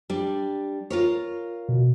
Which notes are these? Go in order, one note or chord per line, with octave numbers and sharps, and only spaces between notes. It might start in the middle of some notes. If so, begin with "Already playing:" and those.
G3 D4
F4 A#4 C#5
B2